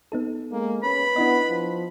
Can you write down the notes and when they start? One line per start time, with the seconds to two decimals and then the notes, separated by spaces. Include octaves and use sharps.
0.12 B3 D#4 A4
0.52 G#3 A#3
0.83 C#4 B4 B5
1.16 B3 D4 E4 D#5
1.50 F3